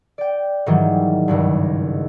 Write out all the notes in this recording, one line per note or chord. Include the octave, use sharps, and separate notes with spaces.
D5 G5
G#2 D#3 E3 F#3 G3
G#1 C#2 G2